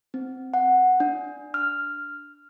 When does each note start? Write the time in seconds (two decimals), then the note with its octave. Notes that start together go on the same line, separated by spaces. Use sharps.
0.14 C4
0.54 F#5
1.00 D4
1.54 F6